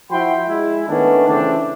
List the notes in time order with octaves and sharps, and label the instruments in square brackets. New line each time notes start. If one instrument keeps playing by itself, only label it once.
[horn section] F3 E4 F#4 G5 B5 C6
G#3 E4
D#3 A3 B3 C#4 D4
C#3 E3 A3 C4 D4